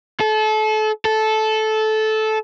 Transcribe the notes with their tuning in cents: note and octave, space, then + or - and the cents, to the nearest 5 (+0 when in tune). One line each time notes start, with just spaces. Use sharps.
A4 -30
A4 -15